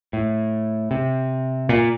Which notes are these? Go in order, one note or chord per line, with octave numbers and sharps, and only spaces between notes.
A2
C3
A#2